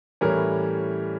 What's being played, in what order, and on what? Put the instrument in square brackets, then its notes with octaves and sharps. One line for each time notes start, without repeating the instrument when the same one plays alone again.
[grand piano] A2 E3 G3 C#4 A#4